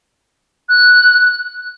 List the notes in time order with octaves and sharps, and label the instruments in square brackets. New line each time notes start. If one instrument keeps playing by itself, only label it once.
[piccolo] F#6